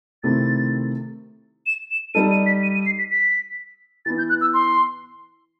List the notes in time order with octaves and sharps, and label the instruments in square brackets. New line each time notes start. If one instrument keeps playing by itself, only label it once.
[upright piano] C3 D#3 A3 C4 E4 [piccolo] A6
[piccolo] E7
E7
[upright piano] G3 D#4 A4 [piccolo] D#7
[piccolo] D#7
B6
D#7
D#7
C7
B6
B6
[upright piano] E3 B3 E4 [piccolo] A6
[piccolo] G6
F#6
E6
C6